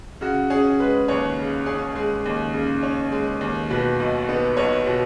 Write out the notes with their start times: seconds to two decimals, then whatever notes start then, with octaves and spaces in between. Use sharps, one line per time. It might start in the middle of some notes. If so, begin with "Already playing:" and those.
0.21 C#3 F#4
0.50 C#4 G#4
0.80 G#3 B4
1.08 D#2 C#5
1.38 C#3
1.66 C#4 G#4
1.95 G#3 G#4
2.25 D#2
2.53 C#3
2.83 C#4
3.12 G#3
3.41 D#2
3.70 B2 B4
4.00 B1
4.29 B3
4.57 B1 C#5
4.87 B2